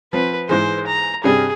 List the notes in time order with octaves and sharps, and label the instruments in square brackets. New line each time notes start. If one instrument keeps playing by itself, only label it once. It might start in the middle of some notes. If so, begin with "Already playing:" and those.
[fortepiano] F3 C4 [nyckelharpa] B4
[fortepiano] G#2 E3 G#3 [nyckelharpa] C5
[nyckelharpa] A#5
[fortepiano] G2 C3 G3 [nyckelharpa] G#4